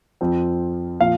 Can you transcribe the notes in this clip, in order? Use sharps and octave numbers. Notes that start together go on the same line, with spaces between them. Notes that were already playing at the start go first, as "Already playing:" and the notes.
F2 F3 C4
A#2 F3 F5